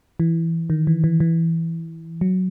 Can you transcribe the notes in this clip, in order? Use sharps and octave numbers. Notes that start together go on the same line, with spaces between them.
E3
D#3
E3
E3
E3
F#3